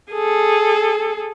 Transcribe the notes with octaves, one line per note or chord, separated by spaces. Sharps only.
G#4 A4